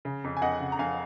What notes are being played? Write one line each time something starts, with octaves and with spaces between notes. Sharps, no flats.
C#3
F2
G#5
F2 D#5 F#5
C#3
A#5
F2 F5 G#5